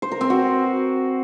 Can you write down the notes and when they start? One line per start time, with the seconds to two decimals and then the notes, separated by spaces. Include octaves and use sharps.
0.02 C5
0.11 A#4
0.21 C4
0.30 F#4